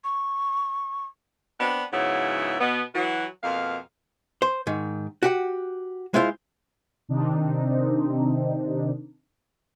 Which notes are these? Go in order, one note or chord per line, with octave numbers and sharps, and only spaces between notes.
C#6
B3 C4 D4
G#2 C#3 F#3 B3 E4
B2 B3
E3 F#3 F#4
F2 B2 A#3 F5
C5
G#2 D#3
F#4 G4 F#5
G#3 E4 F4 C5 F5
C3 D#3 C4 D4 D#4